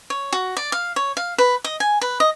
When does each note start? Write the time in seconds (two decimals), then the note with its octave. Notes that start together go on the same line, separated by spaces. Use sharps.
0.10 C#5
0.33 F#4
0.57 D5
0.72 F5
0.96 C#5
1.17 F5
1.38 B4
1.64 D#5
1.80 G#5
2.01 B4
2.20 D#5